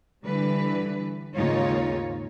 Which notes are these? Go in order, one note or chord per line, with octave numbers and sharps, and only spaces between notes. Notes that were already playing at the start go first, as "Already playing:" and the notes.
D3 E3 G3 B4
D#2 G#2 C#3 D#4 F4 C#5